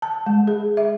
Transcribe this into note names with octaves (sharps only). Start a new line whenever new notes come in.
A5
G#3
G#4
E5